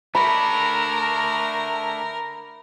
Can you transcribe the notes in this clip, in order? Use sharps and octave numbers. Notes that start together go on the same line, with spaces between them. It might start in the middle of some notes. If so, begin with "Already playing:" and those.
A3 D4 A#4 B5